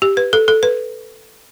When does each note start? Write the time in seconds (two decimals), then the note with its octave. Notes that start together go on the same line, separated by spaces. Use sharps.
0.02 G4
0.17 B4
0.33 A4
0.48 A4
0.63 B4